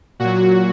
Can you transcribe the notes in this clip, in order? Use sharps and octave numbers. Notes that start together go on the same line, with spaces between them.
A#2 F#3 F#4